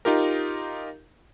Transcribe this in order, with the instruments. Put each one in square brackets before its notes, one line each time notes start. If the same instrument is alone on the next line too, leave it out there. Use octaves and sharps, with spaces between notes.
[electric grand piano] D#4 F4 G4 A#4